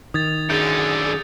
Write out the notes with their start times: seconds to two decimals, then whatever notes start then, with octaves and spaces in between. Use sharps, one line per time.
0.14 D#3 D#6 G#6 A6
0.50 F#2 D3 G#4 G6 A6